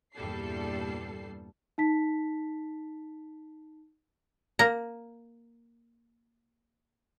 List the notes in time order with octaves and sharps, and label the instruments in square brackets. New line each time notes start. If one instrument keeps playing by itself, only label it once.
[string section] E2 G2 A#2 G3 A4 C7
[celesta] D#4 A5 B6
[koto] A#3 A#5